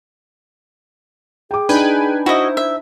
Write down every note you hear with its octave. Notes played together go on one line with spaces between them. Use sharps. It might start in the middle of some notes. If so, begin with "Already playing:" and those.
G#4 G5 D6
D4 D#4 B4 G5 G#5
E4 F#4 C5 D#5
E5